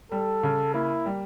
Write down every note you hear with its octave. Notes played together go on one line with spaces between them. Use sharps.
G3 A4
C#3
A#3 E4
G3